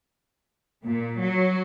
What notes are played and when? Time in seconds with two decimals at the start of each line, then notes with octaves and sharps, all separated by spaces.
0.85 A#2
1.20 F#3